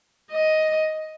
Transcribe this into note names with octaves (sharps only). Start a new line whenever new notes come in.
D#5